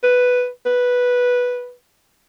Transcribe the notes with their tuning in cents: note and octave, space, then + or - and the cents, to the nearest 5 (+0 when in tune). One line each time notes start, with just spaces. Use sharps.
B4 +0
B4 -5